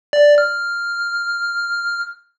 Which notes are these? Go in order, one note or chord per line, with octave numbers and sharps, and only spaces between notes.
D5
F6